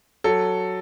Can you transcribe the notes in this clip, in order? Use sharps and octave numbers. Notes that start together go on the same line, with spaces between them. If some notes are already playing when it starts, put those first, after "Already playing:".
F#3 A4